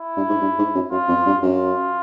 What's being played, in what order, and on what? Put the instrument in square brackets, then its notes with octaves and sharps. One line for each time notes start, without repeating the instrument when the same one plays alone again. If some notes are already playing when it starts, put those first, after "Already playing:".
Already playing: [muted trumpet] E4
[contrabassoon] G2
G#2
G2
G#2
F#2
[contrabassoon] F#2 [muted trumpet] F4
[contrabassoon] F2
G2
[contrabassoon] F#2 [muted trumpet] F4